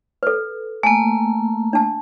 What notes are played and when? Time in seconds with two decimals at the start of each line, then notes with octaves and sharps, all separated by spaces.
0.23 A4 B4
0.83 A3 A#3 G#5
1.73 D4 A5